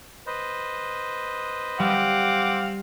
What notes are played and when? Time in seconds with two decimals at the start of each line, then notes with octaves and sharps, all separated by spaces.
0.27 B4 C5 D#5
1.79 G3 C4 F5 F#5 D6